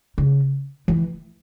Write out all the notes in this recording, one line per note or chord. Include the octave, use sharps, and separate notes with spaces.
C#3
E3